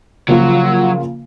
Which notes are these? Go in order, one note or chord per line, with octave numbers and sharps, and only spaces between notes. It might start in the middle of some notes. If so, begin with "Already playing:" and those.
C#3 F3 F#3 A#3 F4